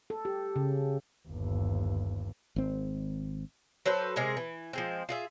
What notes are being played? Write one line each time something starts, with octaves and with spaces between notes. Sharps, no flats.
A4
G4
C#3
G1 D#2
G#1 C4
F#3 A4 B4 C5
C3 G#3 G#4 A#4
E3
F3 G#3 C4
F4 G#4 E5